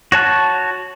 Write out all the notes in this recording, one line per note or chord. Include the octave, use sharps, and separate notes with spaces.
F#4 C#5 A5 F#6